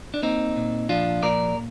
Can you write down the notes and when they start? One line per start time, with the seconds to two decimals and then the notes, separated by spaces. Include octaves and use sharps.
0.14 D4
0.23 A#3 C4 D#4
0.56 A#2
0.89 F3 D4 F4
1.22 A#2 A#4 D5